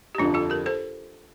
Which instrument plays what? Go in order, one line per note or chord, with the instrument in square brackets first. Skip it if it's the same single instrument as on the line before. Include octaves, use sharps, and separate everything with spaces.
[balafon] G4
[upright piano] G1 F2 D3 F3 [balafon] D4 F4
[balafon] F4 A4
G4 A#4
A4 C5